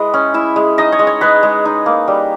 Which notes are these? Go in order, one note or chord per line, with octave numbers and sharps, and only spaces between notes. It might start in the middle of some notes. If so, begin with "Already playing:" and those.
Already playing: G#3 E4 B4 D#5
C#4
E4 E5
G#3
D#4 D#5
C#5
G#3
C#5
G#3 B4
G#3
D#4
A#3
G3